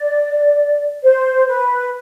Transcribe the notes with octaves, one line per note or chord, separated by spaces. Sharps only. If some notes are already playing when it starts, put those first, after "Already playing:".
Already playing: D5
C5
B4